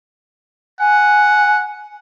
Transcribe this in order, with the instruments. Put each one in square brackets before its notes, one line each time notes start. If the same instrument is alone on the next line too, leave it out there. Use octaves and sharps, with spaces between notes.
[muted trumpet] F#5 [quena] G#5